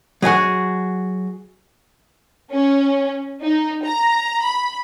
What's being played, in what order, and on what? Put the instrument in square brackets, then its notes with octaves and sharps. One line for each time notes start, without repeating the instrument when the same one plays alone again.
[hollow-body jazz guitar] F#3 D#5 G#5 [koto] F#4 G#4
[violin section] C#4
D#4
A#5
B5